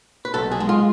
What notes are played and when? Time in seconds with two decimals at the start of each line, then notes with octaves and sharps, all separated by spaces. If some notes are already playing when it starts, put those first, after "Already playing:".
0.25 B4
0.34 B1 A4
0.52 G#4
0.60 G#3
0.69 F4